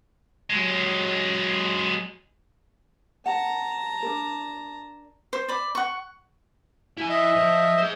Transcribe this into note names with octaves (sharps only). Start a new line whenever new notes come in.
F#3 G#3
F#5 A5 A#5
D4 A#4
C5
D5 B5
F#5 C#6
E4 G#5
D#5 E5
F3
G#4 C5